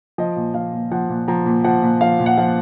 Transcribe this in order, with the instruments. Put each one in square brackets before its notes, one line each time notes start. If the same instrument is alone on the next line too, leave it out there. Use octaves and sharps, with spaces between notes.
[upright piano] F3 D#5
A#2
F3 F5
A#2
F3 F#5
A#2
F3 A#5
A#2
F3 F#5
A#2
F3 F5
A#2
F#5
F3 F5